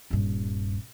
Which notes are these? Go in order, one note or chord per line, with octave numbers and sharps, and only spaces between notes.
D#1 G2